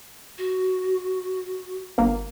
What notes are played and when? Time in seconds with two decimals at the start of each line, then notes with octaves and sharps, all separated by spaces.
0.38 F#4
1.98 G1 A#3